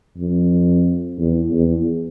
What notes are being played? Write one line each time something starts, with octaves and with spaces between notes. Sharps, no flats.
F2
E2
E2